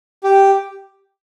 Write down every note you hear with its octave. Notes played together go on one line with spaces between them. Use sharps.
G4